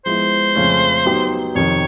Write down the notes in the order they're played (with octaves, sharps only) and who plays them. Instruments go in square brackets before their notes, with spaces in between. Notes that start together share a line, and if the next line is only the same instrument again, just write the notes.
[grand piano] F3 G#3 B3 E4 [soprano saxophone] C5
[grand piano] F2 C#3 F3 A3 C#4
F#3 B3 D#4 G4
[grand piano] F2 C3 D#3 [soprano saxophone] C#5